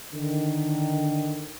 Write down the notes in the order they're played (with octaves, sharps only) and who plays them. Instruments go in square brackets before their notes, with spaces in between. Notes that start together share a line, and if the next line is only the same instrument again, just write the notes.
[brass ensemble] D3 D#3